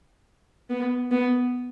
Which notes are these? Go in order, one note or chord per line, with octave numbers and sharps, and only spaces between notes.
B3
B3